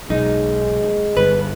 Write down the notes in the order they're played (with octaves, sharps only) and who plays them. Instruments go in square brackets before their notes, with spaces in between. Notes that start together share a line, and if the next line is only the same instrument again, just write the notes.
[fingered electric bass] B1 [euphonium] G#3 [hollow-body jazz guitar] D#4
[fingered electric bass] G1 [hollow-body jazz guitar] B4